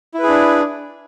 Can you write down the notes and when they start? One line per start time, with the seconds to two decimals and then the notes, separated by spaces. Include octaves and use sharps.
0.14 E4
0.19 B4
0.23 G#4
0.28 D4